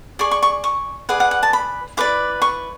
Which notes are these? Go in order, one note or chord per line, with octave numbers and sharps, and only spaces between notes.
G#4 D5 C#6
C#6
C#6
C#6
G#4 B4 D5 F#5
F#5
F#5
A5
B5
E4 B4 D5 D6
C#6